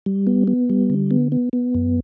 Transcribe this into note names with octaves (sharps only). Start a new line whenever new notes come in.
G3
B3
B3
G3
D3
B3
B3
B3
F#2